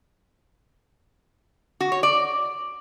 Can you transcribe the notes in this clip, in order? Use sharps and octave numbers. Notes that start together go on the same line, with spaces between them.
F#4
C#5
D5